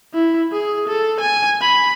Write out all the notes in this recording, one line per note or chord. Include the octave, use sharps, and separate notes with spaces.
E4
G#4
A4
G#5
B5